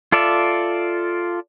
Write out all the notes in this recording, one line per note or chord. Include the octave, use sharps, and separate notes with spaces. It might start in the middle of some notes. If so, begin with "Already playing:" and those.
F4 A4 D5 E5